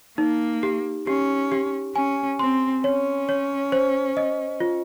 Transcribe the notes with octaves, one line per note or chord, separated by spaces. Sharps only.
A#3 D#4
G4
C#4 G4
G4
C#4 G#5
C4 C6
C#4 C#5
C#5
C5
D#5
F4